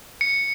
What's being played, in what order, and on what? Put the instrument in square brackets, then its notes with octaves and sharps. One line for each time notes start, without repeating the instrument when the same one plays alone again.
[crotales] C#7